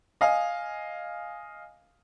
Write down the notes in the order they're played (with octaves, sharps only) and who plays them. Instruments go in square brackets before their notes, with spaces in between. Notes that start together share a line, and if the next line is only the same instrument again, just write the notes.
[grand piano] D#5 F5 G#5